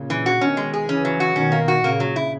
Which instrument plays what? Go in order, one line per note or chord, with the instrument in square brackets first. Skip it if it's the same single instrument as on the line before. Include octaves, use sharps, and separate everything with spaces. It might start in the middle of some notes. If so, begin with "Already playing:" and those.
Already playing: [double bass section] A#2 C#3
[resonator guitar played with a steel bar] E3
F#4
[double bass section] B2 D#3 [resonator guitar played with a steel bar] C#4
[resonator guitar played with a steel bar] G#3
G#4
[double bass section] C#3 E3 [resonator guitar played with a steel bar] C#4
[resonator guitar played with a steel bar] F#3
F#4
[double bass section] B2 D#3 [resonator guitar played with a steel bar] C#4
[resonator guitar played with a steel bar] A#3
F#4
[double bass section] A#2 C#3 [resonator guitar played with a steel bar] A#3
[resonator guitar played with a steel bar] F#3
E4